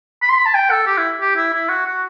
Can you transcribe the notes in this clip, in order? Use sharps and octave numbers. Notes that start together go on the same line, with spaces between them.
B5
C6
B5
A5
G5
A4
G4
E4
G4
E4
E4
F#4
F#4